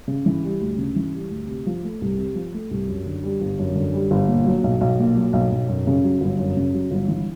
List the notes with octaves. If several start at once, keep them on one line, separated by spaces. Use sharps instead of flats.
C#3
E3
G3
D2
C#3
E3
G3
D2
C3
F3
A3
C2
C3
F3
A3
C2
F#2
D3
G3
G1
F#2
D3
G3
G1
A#2
F#3
B1
B1
A#2
F#3
B1
B1
F#2
C#3
F#3
G1
F#2
C#3
F#3
G1
E3